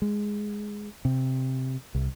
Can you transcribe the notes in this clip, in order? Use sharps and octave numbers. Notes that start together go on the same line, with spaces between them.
G#3
C3
C2